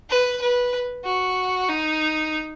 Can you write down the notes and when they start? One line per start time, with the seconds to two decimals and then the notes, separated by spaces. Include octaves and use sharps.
0.10 B4
0.42 B4
1.05 F#4
1.69 D#4